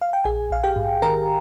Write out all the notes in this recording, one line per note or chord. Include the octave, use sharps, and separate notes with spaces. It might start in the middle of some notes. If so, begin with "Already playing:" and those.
F5
G5
A#1 G#4 G#5
A#1 F5
G4 G5
G#2
D#3 A#4 A#5